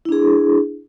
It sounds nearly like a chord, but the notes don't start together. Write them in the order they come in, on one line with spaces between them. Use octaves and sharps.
E4 D4 G#4